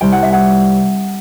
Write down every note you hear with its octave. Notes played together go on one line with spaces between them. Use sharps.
C2 C3 G3 G5
F#5
E5
F#5